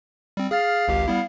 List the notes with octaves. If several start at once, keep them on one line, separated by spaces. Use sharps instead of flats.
G3 C4
G#4 F5 F6 A6
G#1 C#2 G4
G3 B3 E4